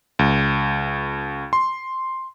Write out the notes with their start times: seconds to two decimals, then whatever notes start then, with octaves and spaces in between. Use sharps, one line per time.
0.19 C#2
1.53 C6